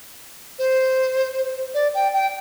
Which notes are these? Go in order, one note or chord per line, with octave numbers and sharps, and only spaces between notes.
C5
D5
G5
G5